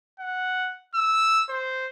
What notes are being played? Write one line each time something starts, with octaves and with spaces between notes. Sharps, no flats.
F#5
E6
C5